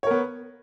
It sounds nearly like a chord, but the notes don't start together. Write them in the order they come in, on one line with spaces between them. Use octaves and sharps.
C#5 A#4 B3